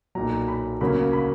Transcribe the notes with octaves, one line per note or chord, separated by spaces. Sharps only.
B1 A#2 F#3 A#5
B5
D2 C#3 F#3 A#3 C#4 B5
B5